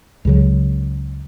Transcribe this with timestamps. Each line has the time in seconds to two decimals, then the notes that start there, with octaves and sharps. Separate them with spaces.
0.25 C#2 C#3 F#3